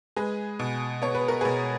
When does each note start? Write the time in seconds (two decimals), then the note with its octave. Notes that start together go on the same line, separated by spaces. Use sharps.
0.16 G#3 G#4 B4
0.59 B2
1.02 B3 C#5
1.15 B4
1.28 A#4
1.41 B2 G#4 B4